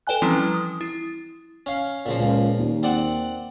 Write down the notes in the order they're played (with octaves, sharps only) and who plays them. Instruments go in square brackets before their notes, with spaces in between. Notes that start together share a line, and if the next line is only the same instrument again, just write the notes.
[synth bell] A4 B4 D5 G5 G#5 F#6
E3 F3 G3 C4 C#4 E4
D#6
E4
[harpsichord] C#4 F5
A#2 C#3 F3
[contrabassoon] C#2
D#2
[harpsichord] C4 D5 F#5